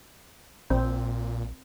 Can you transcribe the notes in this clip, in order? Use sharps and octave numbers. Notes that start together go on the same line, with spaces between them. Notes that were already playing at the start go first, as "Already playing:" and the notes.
A#1 A#2 C4